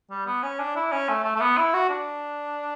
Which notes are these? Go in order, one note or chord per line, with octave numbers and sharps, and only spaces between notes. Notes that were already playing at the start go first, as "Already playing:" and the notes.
G3
B3
C#4
D4
E4
C#4
A3
A3
A3
B3
E4
F#4
D4